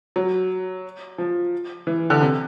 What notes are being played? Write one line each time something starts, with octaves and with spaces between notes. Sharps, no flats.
F#3
F3
E3
D3
C3